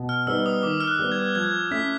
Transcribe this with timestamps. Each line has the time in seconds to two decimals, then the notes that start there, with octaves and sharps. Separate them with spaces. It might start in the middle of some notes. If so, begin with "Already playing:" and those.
Already playing: B2
0.09 F6
0.27 G3 B3 D#4 E6
0.46 D#6
0.63 D#3 D6
0.80 F6
0.88 F#6
0.99 G3 B3
1.12 G#6
1.35 F3 G#6
1.71 A3 C#4 E4 B6